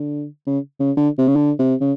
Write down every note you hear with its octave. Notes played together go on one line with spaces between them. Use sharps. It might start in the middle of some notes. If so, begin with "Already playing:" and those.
Already playing: D3
C#3
C#3
D3
C3
C#3
D3
C3
C#3